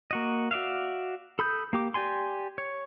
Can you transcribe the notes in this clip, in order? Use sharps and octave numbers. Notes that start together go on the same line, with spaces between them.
A#3 F#4 D#5
F#4 D5 E5 F5
A4 B5 D#6 G6
A#3 G4 D6
G4 D5 G#5 C6
C#5